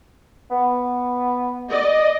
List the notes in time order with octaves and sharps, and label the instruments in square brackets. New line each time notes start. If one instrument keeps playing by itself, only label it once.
[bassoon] B3
[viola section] D5 D#5